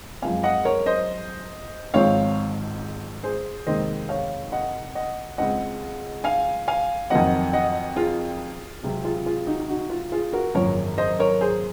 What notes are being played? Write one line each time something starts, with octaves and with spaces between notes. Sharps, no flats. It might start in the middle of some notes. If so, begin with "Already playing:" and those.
F#2 F3 G#3 C4 F5 G#5
D#5 F#5
A#4 C#5
C5 D#5
G#1 G#2 F3 C4 C#5 F5
G#4 C5
F1 D#2 D#3 G#3 C4 C5 D#5
C#5 F5
D#5 F#5
D#5 F#5
C#2 C#3 G#3 C4 D#5 F#5
F5 G#5
F5 G#5
F2 D#3 F#3 C4 D#5 F#5
D#5 F#5
F4 G#4
C#2 C3 F#3 C4
F4 G#4
F4 G#4
D#4 F#4
D#4 F#4
F4
F4 G#4
F#4 A#4
G#1 F#2 C#3 F3 A#3 A#4 C#5
C5 D#5
A#4 C#5
G#4 C5